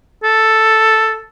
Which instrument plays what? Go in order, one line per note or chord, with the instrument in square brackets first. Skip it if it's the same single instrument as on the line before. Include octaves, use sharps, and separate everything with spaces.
[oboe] A4